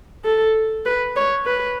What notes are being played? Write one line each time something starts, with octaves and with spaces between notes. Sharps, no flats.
A4
B4
C#5
B4